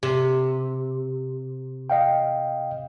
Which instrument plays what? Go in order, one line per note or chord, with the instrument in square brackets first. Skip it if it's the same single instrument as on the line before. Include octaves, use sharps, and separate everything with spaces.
[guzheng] C3
[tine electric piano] D#5 F5 G5